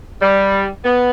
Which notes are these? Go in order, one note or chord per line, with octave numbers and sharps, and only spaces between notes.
G3
B3